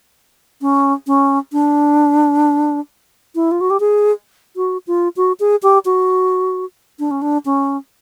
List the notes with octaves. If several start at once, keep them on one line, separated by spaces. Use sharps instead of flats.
C#4
C#4
D4
E4
F4
F#4
G4
G#4
F#4
F4
F#4
G#4
G4
F#4
D4
C#4
D4
C#4